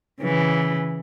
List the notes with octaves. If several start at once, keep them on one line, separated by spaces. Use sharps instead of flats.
C#3 E3